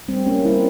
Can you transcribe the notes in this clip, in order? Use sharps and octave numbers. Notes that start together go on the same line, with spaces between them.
G3 C4
A#3 C#4
G3 C4 E4